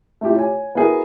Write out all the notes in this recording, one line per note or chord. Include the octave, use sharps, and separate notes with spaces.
A3 E4 F4 G4 E5
C#5 G#5
B3 E4 F#4 G#4 A#4